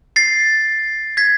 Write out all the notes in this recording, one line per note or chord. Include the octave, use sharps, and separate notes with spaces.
A6 C7
G#6 B6